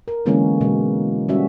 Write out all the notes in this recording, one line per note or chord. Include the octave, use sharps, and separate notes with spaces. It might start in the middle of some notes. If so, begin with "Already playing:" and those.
A#4
D3 E3 G#3 A#3 B3 C#4
B2 G#3
G3 C#4 F#4 E5